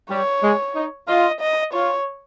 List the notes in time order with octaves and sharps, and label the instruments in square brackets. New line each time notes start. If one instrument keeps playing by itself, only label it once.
[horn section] G3 [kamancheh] C#5
[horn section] G#3
D#4
[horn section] F4 [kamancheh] D#5
[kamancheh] D#5
[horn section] F4 [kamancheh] C#5